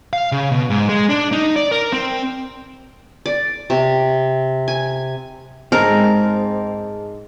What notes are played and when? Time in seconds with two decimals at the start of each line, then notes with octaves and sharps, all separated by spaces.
0.13 F5
0.32 C#3
0.52 B2
0.70 G#2
0.89 G#3
1.09 D4
1.32 D#4
1.56 D5
1.72 A#4
1.93 C4
3.26 D5
3.70 C3
4.68 G#5
5.72 G#2 G#3 C4 G#4 A#4 D#5 A5